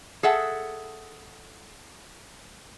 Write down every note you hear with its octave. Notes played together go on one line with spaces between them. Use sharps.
G#4 A4 E5 F#5